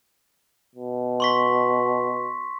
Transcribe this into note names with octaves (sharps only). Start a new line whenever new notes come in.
B2
C6 C#6 B6